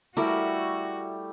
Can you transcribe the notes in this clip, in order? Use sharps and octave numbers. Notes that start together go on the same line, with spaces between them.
G3 A3 E4 F#4 A#4